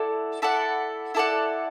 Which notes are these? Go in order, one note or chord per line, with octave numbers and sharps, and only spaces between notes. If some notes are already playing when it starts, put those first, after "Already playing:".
Already playing: E4 A4 D5 F#5
E4 A4 D5 F#5
E4 A4 D5 F#5